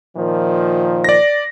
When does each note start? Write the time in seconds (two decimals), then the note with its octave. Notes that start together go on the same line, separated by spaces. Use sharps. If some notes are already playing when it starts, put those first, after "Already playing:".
0.17 A#2 D#3 F3
1.04 D5 A#6